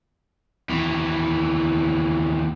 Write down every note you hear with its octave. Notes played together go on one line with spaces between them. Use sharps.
D#2 E3